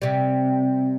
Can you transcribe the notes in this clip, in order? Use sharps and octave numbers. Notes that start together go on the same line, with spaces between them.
C3 G3